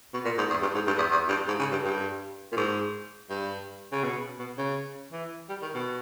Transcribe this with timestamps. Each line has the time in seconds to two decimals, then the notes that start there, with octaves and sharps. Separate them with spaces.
0.14 B2
0.25 A#2
0.38 G#2
0.50 E2
0.62 G2
0.74 G#2
0.87 G2
0.98 E2
1.11 E2
1.28 G2
1.48 G#2
1.59 C#3
1.72 G2
1.84 G2
2.52 A#2
2.57 G#2
3.30 G2
3.92 C#3
4.04 B2
4.39 B2
4.58 C#3
5.12 E3
5.49 G3
5.62 D#3
5.74 B2